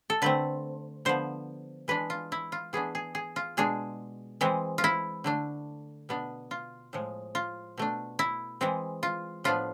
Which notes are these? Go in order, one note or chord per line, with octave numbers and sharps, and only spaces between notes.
A4
D3 A3 C4 B4
D3 F3 B3 C5
E3 G#3 D4 B4
F4
E4
F4
E3 B3 D4 G#4
G#4
G#4
F4
B2 G#3 D4 G#4
E3 G#3 C4
F4
E4
D3 A3 D4
B2 B3 D4
F4
A2 F3 G#3
F4
B2 A3 D4
E4
E3 G#3 C4
F4
A2 F3 B3 D4 F4